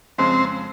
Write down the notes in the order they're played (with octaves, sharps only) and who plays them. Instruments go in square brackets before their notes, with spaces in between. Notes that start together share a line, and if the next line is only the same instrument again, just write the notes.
[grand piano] F2 C#3 G#3 [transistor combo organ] C4